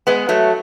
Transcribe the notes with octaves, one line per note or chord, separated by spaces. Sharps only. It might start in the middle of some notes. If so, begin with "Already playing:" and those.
G#3 B3
F#3 A3